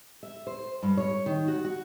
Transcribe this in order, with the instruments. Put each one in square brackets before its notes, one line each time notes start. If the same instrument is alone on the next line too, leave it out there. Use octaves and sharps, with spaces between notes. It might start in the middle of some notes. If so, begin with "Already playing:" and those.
[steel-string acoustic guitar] E5
C5
G2
C#5
D#3
F#4
F#4